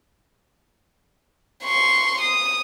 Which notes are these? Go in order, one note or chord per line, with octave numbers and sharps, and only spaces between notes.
C6 C#6
D#6